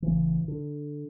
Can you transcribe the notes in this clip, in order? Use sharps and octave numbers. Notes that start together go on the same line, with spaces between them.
A1 C#3 E3
D3